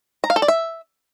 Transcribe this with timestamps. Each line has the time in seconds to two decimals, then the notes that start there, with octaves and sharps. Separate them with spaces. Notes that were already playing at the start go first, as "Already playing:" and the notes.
0.24 A#5
0.30 F5
0.36 A4
0.42 D5
0.48 E5